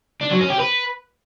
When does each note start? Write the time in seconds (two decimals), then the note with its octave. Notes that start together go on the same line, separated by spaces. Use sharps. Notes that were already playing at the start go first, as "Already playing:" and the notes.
0.21 D4
0.31 F#3
0.40 C#4
0.50 G4
0.60 B4